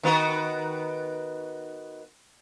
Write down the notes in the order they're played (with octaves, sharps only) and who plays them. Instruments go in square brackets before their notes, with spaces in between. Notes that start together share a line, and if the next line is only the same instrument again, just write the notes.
[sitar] D#3 B3 F#4